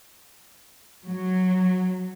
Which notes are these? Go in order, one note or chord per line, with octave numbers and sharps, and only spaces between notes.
F#3